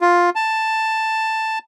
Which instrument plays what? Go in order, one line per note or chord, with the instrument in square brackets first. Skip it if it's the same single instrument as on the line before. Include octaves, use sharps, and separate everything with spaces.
[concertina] F4
A5